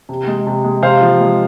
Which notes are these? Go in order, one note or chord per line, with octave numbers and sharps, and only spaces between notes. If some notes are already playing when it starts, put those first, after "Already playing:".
C3
G#3
C3
G#3
C3 C5 F5
F3
G#3